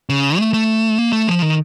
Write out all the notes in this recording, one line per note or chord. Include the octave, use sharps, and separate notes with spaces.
C#3
A3
A3
A#3
A3
F3
D#3